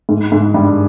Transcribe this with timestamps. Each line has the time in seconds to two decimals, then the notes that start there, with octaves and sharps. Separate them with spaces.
0.09 G#2
0.32 G#2
0.54 G2